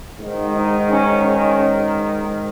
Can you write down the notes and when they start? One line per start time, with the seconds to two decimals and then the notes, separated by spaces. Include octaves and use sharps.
0.19 G#2 D#3
0.55 D#4
0.90 C#4
1.25 C#4